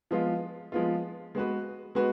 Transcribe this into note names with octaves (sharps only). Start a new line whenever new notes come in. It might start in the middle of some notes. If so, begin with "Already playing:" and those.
F3 G#3 B3 F4
F3 G#3 B3 F4
G#3 B3 F#4 B4
G#3 B3 F#4 B4